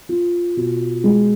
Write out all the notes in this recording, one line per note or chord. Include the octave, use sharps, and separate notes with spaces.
F4
B2
G#3